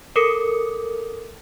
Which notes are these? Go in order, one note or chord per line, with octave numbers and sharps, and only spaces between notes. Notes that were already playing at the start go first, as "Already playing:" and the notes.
A4 A#4 D6 D#6 C#7